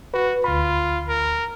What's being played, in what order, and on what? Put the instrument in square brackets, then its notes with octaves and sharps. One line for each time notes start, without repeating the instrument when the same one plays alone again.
[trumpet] F#4 [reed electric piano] B4
[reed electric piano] D2 B5 [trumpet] F4
[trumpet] A#4